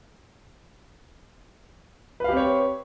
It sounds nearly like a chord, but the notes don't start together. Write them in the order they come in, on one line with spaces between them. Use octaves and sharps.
B4 F5 G4 C4 C#5